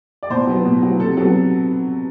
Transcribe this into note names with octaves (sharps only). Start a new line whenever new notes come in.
D5
B2 C5
F#3 B3
B2
F#3 B3
C3 A4
F#3 B3 A4